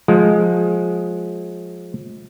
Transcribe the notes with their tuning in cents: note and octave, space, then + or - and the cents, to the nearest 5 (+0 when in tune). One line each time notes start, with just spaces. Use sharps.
F3 +25 G#3 +15